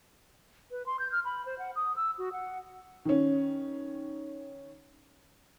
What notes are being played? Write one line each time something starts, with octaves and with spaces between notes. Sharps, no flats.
B4
C6
G6
F6
B5
C5
F#5
D#6
E6
F#4
F#5
D#3 C#4